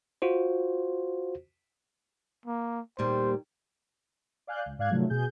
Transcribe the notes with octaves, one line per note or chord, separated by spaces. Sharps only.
F4 F#4 C5
A#3
D#2 A#2 G3 C5
D5 F5 G#5 F#6 G6
C#2
G#2 D5 F5 F#6 G#6
C3 D#3 F3 F#3 A3
B2 G#4 G6